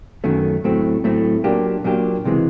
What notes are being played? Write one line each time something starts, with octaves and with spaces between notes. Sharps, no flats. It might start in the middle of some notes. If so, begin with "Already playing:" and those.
F#2 D#3 F#3 A3 C#4
A2 F#3 A3 C4
A2 F#3 A3 C4
A#2 F#3 A#3 D4 G4
A#2 F#3 A#3 D4 G4
C#2 C3 E3 G#3